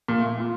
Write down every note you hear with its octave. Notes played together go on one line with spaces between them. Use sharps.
A#2
A3
A#3
F4